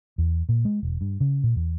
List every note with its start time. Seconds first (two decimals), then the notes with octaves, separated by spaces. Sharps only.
0.18 E2
0.49 A#2
0.65 G#3
0.83 E1
1.01 G2
1.20 C#3
1.44 A#2
1.56 E2